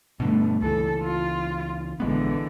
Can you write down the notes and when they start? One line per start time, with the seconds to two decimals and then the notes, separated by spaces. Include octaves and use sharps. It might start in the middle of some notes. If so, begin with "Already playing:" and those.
0.20 G2 B2 D3 A3
0.62 C#2 E3 A4
1.03 F4
2.00 A#1 D3 E3 G#3 B3